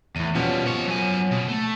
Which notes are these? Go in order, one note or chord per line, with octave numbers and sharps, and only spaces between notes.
E2 A2 D#7
B2 F3 G3 B3 C#4
B2 C#5
F#3 G#5
B2
A3